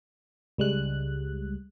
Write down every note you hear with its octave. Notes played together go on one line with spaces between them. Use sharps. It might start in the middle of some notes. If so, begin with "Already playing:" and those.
C#2 G3 G#3 F#6